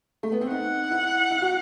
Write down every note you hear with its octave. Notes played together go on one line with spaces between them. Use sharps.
A3
B3
C4
D#4 F#5
E4
E4
F#4